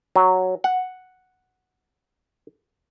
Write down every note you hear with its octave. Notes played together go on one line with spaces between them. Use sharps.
F#3
F#5